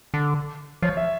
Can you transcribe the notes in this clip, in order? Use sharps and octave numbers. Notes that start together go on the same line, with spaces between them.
D3
F3 C#5
E5